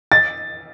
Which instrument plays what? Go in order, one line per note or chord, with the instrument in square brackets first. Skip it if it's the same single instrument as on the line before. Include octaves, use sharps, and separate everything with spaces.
[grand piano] A6